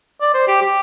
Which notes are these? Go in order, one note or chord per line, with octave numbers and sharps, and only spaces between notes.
D5
C5
G4
G4